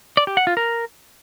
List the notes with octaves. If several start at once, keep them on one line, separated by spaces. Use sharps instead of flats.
D5
G4
F#5
F4
A#4